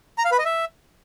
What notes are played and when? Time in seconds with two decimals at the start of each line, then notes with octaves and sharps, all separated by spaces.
0.18 A#5
0.25 F5
0.32 B4
0.38 D#5
0.45 E5